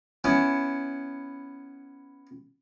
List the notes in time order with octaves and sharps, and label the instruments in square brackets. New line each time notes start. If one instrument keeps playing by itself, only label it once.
[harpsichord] B3 C#4 E4